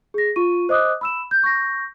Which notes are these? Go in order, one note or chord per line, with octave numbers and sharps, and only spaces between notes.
G#4 A#6
F4 C#6 D#7
C5 D#5 D6 D#6 F#6
B5 E6 E7
G6
C#6 G6 A#6